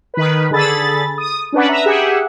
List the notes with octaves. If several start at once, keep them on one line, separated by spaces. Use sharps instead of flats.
D#3 B4
D3 G#4 A4 B5 A6
D#6
C#4 D4 B4 F#5
B4 E5 A#5
G4 G#4 E5 F#5